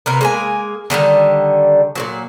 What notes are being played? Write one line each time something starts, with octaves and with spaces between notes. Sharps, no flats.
C3 A#4 B4
G#3 A#3 G#5
D3 D#3 F3 G3
A#2 D3 F#3